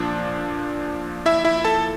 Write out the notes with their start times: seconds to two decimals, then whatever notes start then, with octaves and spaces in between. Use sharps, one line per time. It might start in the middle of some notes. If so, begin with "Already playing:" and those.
Already playing: A#2 F3 D4
1.26 E4 E5
1.45 E4 E5
1.65 A4 A5